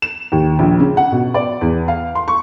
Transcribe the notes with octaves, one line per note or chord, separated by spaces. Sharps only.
E7
D#2
A#1
C#3
F#5
B2
D5
E2
F5
C6
C#6